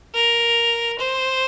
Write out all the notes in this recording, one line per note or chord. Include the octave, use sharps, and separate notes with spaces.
A#4
C5